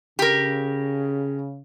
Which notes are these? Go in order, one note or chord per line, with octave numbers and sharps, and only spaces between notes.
C#3 G4 A#4